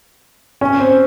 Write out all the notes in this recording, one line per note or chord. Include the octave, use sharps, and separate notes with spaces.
C#4
C4